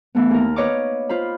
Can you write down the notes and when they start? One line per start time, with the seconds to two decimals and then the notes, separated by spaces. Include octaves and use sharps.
0.15 E3 A3 B3
0.31 D#2 A#4
0.56 B4 C#5 D#5 F5 C#6 D6
1.09 F4 C5 B5